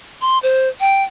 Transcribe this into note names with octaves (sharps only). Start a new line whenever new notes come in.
C6
C5
G5